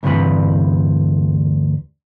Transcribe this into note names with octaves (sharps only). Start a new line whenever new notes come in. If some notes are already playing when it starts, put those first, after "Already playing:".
D2 G2 C3 E3 B4